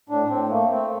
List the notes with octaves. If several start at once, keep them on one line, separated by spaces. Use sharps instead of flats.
A2 D4
A2 C4
A3 A#3
A3 C4